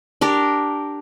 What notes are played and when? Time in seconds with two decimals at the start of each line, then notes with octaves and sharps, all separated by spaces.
0.21 D4 G4 A#4